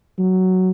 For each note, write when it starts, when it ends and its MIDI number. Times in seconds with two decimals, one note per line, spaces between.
0.19 0.71 54